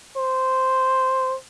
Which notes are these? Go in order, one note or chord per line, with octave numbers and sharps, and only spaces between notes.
C5